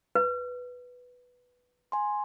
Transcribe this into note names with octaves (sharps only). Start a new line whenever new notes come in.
B4
G#5 C6